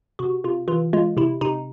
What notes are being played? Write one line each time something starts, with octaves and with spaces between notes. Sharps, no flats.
C3 F#4
C3 F4
E3 F4
G#3 F4
C3 E4
C3 D#4